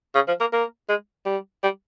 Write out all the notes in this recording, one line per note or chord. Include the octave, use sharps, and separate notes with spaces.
C#3
F3
A#3
A#3
G#3
G3
G3